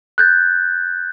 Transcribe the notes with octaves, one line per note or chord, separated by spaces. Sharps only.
F#6 G6 A6